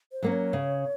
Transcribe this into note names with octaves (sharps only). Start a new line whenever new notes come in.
C5
F#3 A#3 C#4
C#5
C#3